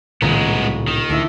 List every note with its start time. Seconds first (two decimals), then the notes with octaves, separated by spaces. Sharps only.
0.22 D#1 C2 A2 C#3 G#3 B3 A#5 C#6
0.88 D#3
1.10 D2 D4 E4 E5